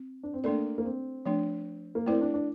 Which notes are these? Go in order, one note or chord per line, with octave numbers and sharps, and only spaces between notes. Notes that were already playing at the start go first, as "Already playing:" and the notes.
Already playing: C4
D4
C4
A3 A#3 D4 A4 D5
A#3
C4
F3 A3 D4
A#3
A3 C4 E4 A#4 D5
D4
D4